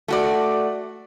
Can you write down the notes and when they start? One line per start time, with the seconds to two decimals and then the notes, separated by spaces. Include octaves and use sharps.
0.08 A3 F#4 D5